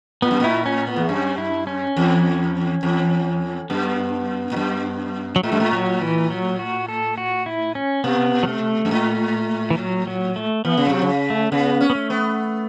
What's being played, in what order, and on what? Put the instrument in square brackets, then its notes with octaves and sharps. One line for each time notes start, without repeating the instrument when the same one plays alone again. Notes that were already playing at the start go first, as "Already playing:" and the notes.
[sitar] A2 [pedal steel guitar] B3
[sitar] F#2
[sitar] A2 [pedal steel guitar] E4
[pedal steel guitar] C#4
B3
[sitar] E2
[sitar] F#2 [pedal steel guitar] C#4
[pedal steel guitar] E4
C#4
[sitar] E2
E2
[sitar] F#2 [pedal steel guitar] B3
[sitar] A2
F#2
[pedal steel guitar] F#3
[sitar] A2 [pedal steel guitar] A3
[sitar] F#2
A2
[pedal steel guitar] F#3
E3
F#3
F#4
A4
F#4
E4
C#4
[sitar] B2 [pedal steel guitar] B3
[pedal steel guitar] F#3
A3
[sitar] F#2
A2
[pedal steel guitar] E3
F#3
F#3
A3
[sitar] E3 [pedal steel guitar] B3
[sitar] C#3
[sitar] B2 [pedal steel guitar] F#3
[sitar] C#3
[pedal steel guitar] A3
[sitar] C#3 [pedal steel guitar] B3
[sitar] C#4
[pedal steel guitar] B3
A3
[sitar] B3